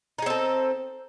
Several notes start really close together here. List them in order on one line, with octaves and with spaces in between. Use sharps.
D#4 G#4 C4 A4